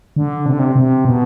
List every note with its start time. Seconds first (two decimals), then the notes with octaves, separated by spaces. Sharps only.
0.16 D3
0.46 C3
0.53 D3
0.59 C3
0.75 C3
1.05 B2